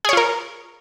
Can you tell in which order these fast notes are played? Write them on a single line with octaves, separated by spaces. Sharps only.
G#4 C#5 F4 A#4